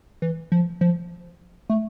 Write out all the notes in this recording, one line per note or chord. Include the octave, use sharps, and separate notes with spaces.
E3
F3
F3
A3